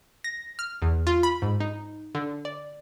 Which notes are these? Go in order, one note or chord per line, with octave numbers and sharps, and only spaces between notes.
A#6
F6
E2
F4
B5
G#2
D#4
D3
D5